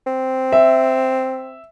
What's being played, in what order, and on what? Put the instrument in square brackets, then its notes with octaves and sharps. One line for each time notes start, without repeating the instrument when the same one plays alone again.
[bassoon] C4
[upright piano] E5